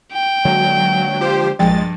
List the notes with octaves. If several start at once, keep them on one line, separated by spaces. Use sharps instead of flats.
G5
D3 F#3 G#3 A#3
F3 G4 C5
A#1 G2 F3 G#3 G5 A6